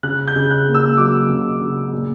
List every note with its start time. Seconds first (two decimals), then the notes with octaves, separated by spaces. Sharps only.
0.03 C#3 F#6
0.27 G6
0.36 C#3
0.51 F#6
0.67 A#3
0.74 E6
0.97 F#3 D6
1.29 C#3
1.61 C#3
1.92 A#2